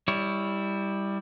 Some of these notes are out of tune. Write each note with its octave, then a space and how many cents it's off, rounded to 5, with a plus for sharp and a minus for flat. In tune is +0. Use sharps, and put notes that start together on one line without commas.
G3 +10 E4 -10 C#5 +5